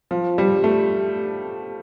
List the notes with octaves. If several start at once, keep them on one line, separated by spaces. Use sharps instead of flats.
F3
G3
A3